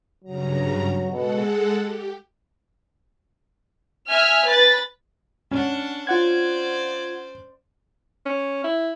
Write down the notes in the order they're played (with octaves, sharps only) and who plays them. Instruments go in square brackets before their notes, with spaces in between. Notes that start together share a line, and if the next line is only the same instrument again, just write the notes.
[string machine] G2 C#3 A#5 [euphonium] F#3
[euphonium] B2 [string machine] G#3 A4 F#5
[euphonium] G#4
[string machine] G4
[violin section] E5 G#5 F6
B4 A6
[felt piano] C#4 [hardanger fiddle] D4 F#5
[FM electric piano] F4 F#5 G#6 [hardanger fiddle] C5 D5
[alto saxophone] C#4
E4